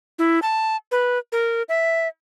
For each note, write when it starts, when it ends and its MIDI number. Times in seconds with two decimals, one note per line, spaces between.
0.19 0.39 64
0.42 0.76 81
0.91 1.18 71
1.32 1.63 70
1.69 2.08 76